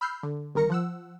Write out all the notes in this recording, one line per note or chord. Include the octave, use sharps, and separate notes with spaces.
B5 E6 F6 G6 C7
D3
G1 D#3 A#4 A#6 C#7
F3 F#5 E6